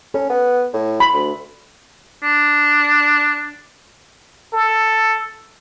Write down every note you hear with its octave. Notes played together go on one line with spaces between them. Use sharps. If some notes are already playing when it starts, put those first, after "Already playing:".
C#4 A4
B3
A2
B5 C6
D2
D4
A4